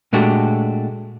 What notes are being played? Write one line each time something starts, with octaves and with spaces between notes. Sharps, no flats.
A#2 G#3 A3 D4 F#4 G4